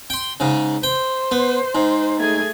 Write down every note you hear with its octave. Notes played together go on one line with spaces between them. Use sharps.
G5 C6
G#2 C#3
C5 G5
B3
G#2
A3 G#4 G#6